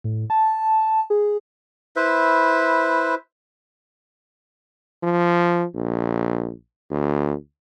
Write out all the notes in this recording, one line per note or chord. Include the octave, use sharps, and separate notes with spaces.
A2
A5
G#4
E4 B4 C5 E5
F3
A#1
D2